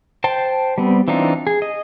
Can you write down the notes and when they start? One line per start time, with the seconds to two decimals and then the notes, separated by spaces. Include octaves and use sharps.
0.24 C5 G5 A5
0.78 G3 B3 C4
1.08 E3 C4 D4 D#4 F4
1.47 G#4
1.62 D#5